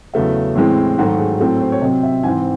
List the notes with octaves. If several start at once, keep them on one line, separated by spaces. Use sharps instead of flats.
E2 C#3 F#3 A3 E5
A2 E3 G#3 C4
G#2 D#3 F#3 A3 F#4
G#4
A2 F#3 A3 C4
C5
C#5
C3 F#3 C4 D#5
E5
G#2 E3 C4 G#5